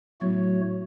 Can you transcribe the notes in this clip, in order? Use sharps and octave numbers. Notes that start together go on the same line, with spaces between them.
A2 F#3 A3 B3 F#4 C#5